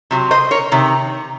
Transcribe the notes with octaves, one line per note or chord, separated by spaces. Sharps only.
C3 F#3
C5 D#5
A#4 C#5
C3 D#3